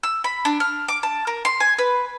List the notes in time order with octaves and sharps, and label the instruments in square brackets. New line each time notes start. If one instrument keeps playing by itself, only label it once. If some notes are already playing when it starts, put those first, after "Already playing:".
[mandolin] E6
B5
D4
F6
D6
A5
A#4
C6
G#5
B4